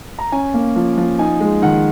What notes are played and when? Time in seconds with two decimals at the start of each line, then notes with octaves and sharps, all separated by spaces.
0.19 A#5
0.32 C#4 G#5
0.54 A#3
0.76 F3
0.97 F3
1.19 D#4 G#5
1.40 G#3
1.62 D#3 F#5